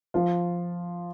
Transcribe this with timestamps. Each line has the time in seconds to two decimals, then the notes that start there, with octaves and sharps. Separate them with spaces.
0.14 F3 F4